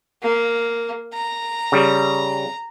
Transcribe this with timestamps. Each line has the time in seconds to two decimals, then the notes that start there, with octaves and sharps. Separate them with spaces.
0.22 A#3
1.14 A#5
1.72 C#3 G3